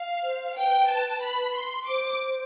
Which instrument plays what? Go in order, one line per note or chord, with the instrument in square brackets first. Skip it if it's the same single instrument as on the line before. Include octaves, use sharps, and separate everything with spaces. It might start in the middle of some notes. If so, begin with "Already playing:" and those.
Already playing: [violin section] F5
[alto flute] C5
[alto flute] B4 [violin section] G5
[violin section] A5
B5
C6
[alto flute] C5 [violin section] D6